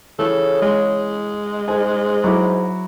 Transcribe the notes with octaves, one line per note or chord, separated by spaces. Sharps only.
C#3 E3 A4
G#3
G#2 G#5
F#3 E4 D6